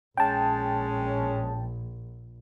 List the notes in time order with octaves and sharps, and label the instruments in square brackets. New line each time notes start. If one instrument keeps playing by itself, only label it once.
[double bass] A#1 [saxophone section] G#3 C#4 [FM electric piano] G5 A5